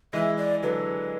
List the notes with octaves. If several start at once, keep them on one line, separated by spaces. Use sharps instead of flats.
E3 G#3 E5
D5
D3 F#3 B4